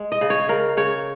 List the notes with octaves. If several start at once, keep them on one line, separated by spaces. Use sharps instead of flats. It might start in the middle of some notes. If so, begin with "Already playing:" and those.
Already playing: G#3
D#5
C#3
C#5
C#3 A#4
C#3 C#5